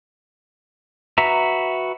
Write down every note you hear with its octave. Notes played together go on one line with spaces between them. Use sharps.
F#4 B4 E5 A#5